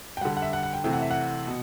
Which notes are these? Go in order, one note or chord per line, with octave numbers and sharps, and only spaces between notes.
G5
D3 G3 F#5
F#5
E5
F#5
F#5
G5
C3 E3 A3 G5
F#5
E5
F#5
B2